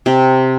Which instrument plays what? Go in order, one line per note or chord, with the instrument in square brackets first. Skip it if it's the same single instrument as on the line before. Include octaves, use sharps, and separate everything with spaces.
[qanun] C3